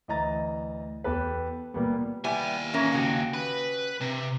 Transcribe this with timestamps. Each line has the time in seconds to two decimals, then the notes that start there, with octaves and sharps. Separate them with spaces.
0.08 D2 E3 D#5 A#5 A6
1.04 E2 G4 A4 B4
1.74 A#2 G3 A#3 B3
2.24 D#2 G3 B3 E4 G#5
2.73 E3 C#4 A#4
2.93 C#3 F#4 G4
3.34 B4
4.00 C3